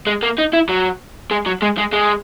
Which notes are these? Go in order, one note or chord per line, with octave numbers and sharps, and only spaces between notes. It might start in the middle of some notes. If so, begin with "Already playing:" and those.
G#3
A#3
D#4
E4
F#3
G#3
F#3
G#3
G#3
G#3